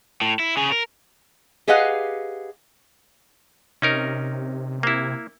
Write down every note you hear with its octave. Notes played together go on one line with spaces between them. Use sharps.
A2
E4
C#3 G#4
A#4
G4 G#4 B4 D#5 F5 F#5
C3 C#4 D#4 A#4
A#3 E4